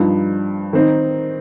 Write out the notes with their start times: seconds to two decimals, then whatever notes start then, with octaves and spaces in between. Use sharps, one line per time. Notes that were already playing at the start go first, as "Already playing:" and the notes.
Already playing: G2 F3 D#4
0.73 D#3 C4 D#4